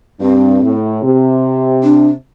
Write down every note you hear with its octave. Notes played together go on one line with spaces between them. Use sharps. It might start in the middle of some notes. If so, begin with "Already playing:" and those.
G2 C4
A2
C3
D4